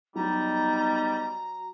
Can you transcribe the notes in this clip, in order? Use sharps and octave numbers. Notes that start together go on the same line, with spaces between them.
F#3 G3 B3 D#4 A#5